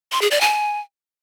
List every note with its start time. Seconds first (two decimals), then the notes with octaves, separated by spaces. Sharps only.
0.12 C6
0.22 G#4
0.31 D5
0.41 G#5